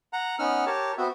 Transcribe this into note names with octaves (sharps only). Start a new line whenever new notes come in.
F#5 A#5
B3 C#4 D#4 F#5 E6 F6
G4 A#4 C#5 A5
B3 C4 F#4 E5